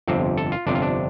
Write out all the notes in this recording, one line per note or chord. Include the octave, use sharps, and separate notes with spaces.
G1 F2 C3 C4
A4
F4
G1 F2 C3 D4
F4
D4